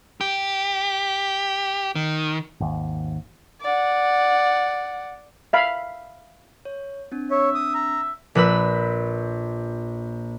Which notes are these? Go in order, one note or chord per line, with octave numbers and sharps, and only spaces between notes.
G4
D#3
G#1 D#2
D5 F#5
E5 F5 B5
C#5
C4 D4
C#5 E5
D#6
A#5
A#1 B4 B5 E6